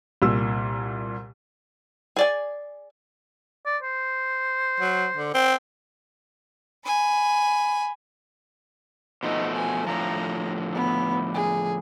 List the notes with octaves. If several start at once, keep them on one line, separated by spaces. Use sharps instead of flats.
C2 A#2 E6
G#4 D5 G#5
D5
C5
F#3
D3
C4
G#5 B5
B2 F3 A3 D#4
G#5
A2 D3 F3 A#5
B3
G#4